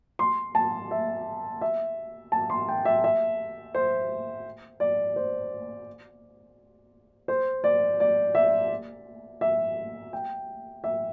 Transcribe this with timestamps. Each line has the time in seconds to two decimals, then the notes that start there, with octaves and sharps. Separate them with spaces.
0.19 C6
0.55 A5
0.91 E5
1.61 E5
2.32 A5
2.50 C6
2.69 G5
2.85 E5
3.04 E5
3.75 C5
4.80 D5
5.16 C5
7.28 C5
7.64 D5
8.00 D5
8.35 E5
9.41 E5
10.13 G5
10.84 E5